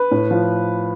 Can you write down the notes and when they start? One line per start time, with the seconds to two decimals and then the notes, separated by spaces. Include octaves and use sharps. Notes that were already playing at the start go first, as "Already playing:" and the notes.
Already playing: B4
0.11 A2
0.31 F3